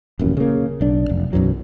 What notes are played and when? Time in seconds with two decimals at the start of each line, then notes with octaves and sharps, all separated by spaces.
0.19 D#1 A1 F#2
0.37 C#3 A#3
0.81 B1 D4
1.09 F1
1.33 B1 F#2 E3 F#3